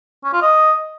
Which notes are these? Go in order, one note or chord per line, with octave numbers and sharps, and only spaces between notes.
C#4
F4
D#5